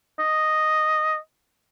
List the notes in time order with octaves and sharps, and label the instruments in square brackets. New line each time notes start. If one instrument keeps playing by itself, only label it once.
[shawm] D#5